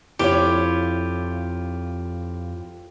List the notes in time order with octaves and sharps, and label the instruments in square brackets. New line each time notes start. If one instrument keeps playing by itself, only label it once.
[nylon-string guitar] F2 [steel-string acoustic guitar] E4 F4 C#5 [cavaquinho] G4